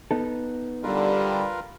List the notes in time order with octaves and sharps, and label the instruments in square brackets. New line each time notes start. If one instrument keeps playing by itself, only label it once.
[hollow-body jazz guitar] B3 D#4 A4
[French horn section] D3 G3 [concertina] F4 A#4 B4